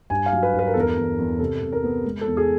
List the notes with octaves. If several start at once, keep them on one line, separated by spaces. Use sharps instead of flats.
G2 G#5
F5
F#3
B4
G2
B4
A#4
E2 A4
A#4
E2
E2
C3 A4
C3
A#4
B3
G#3
A4
E2
G#4